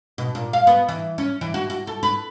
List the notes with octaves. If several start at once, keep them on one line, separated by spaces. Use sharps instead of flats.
B2
A#2
F5
B3
E3
C#4
E3
F#4
F#4
A4
B4